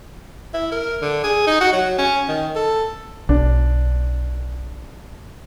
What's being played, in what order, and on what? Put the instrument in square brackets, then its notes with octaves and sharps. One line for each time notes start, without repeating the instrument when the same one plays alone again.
[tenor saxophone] E4
A#4
D3
G#4
D#4
F#4
F#3
C#4
D#3
A4
[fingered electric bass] B1 [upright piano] D4